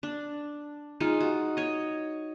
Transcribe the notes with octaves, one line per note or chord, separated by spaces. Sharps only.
D4
G#3 D#4 F4
F#4
C#5 D#5